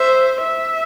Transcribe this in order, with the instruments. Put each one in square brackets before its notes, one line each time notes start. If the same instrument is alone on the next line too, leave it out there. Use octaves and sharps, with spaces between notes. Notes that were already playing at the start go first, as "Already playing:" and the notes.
Already playing: [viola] C5 [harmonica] E5
[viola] E5